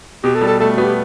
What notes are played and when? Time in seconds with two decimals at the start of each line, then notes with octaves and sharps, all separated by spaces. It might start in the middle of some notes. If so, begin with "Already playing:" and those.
0.24 B2 G4
0.36 A4
0.41 G3
0.47 A4
0.60 A3 A4
0.77 B3 F#4
0.85 G4